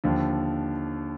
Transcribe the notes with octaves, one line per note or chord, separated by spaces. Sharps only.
D#2 D3 F3